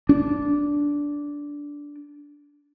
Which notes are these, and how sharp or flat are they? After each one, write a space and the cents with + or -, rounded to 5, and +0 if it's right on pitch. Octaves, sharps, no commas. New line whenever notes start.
D4 -10